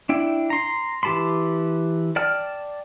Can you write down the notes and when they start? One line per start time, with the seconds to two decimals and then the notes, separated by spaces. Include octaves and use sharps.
0.09 D4 E4 G5
0.50 A#5 C6
1.03 E3 G4 A5 B5 C6
2.16 D5 G5 A5 F6